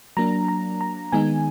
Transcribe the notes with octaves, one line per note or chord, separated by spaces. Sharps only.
F#3 A#3 D4 A#5
A#5
A#5
D#3 G#3 B3 D#4 G#5